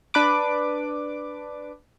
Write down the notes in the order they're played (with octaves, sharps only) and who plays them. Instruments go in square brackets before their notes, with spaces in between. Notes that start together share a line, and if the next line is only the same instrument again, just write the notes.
[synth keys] D4 B4 D6